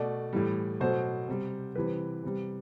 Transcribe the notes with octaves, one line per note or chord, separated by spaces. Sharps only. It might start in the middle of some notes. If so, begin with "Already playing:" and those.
Already playing: B2 A3 D5
A2 E3 G3
B2 F#3 A3 C5
C3 G3
C3 E3 G3 B4
C3 G3